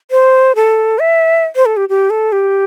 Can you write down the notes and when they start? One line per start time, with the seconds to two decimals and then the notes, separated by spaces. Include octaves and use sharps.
0.11 C5
0.56 A4
0.99 E5
1.56 C5
1.66 A4
1.77 G4
1.89 G4
2.10 A4
2.32 G4